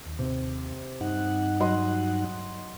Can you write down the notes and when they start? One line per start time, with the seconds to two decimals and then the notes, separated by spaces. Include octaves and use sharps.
0.06 D#2
0.19 C3
1.01 G2 D#4 F#5
1.60 F#3 D#5 C6